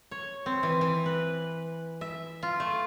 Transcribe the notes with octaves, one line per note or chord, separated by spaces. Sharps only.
C#5
C4
E3
E3
B4
E5
F4
A3